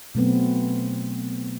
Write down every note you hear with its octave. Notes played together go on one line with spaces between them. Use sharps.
B2 F#3 A3 B3 C4